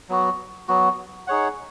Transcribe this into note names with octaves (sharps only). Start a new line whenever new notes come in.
F#3 B3 F#4
F#3 B3 F#4
D#4 G#4 C#5 F#5